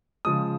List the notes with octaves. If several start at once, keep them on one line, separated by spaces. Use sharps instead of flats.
C#3 F3 G#3 D#6